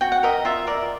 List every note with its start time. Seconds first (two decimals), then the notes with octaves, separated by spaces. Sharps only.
0.01 F#4 G5
0.12 F#5
0.23 A#4 D#5 E5
0.45 F4 E5
0.67 A#4 D5